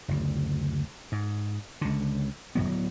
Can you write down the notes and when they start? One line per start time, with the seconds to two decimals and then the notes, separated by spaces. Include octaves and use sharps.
0.08 F#1 D2
1.12 G#2
1.81 C#2 D3
2.55 D1 E2 F#3 B3